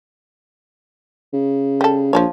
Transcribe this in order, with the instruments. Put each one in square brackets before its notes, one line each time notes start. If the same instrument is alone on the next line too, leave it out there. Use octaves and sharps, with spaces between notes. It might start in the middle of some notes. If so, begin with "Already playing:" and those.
[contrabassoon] C#3
[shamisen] G3 A4
[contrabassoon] A#1 [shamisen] F3 A4 C#5